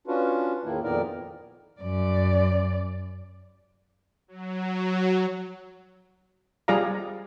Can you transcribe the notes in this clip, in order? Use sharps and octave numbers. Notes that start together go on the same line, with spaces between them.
C#4 D4 F4 F#4 B4
E2 A2 D#3 A#3 E4
F2 A#2 D#3 B3 A#4 D5
F#2 D5
F#3
G3 F4 G#4 D5 F5 A#5